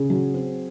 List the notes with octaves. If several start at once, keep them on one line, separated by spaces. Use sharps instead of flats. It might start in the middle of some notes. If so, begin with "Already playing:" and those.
Already playing: C#3 G#4
F#3
C4